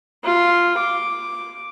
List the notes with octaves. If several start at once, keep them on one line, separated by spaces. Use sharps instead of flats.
F4
D6